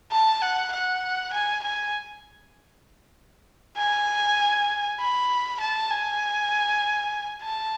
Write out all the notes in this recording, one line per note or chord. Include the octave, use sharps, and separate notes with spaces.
A5
F#5
F#5
G#5
G#5
G#5
B5
A5
G#5
A5